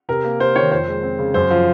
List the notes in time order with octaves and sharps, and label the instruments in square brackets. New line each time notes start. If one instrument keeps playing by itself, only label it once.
[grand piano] C3 A#4
A#3
C3 C5
D#3 C#5
F2 C5
G#3
C4
C#3
F#2 C5
F3